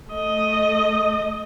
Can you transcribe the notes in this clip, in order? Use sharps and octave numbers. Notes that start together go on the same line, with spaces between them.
A3 D#5